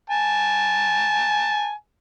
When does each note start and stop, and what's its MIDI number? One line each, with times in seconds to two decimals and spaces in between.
0.10 1.72 80
0.10 1.72 81